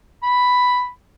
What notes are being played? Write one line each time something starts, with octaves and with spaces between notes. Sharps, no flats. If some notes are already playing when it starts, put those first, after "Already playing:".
B5